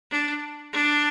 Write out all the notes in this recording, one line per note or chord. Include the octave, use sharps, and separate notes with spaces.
D4
D4